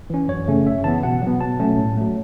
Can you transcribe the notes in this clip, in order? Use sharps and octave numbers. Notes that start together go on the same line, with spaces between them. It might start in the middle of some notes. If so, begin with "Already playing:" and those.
E3 C#4
F#2 C#5
C#3 A3 C#4
F#2 E5
E3 B3 A5
B2 F#5
F#3 B3
B2 A5
F#3 A3 C#4
A2
F#3 A3